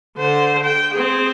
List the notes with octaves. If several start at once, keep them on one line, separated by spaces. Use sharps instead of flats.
D3 C5
G5
C4 G#4